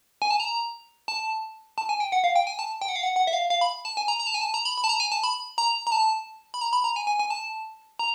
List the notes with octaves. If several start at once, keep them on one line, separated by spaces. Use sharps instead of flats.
G#5
A5
A#5
A5
A5
G#5
G5
F#5
F5
G5
G#5
A5
G5
F#5
F5
F#5
F#5
E5
F5
F5
B5
A5
G#5
A#5
A#5
A5
G#5
A5
A#5
B5
B5
A5
A#5
G#5
A5
B5
A#5
A#5
A5
B5
A#5
B5
A#5
G#5
G#5
G#5
A5
A#5